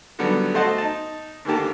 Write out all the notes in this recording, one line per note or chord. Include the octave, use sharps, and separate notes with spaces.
D3 D#3 F#3 G3 B3
A3 F#4 C5 D#5 F#5 A5
D#4 A5
G#2 D3 D#3 A#3 G4 A5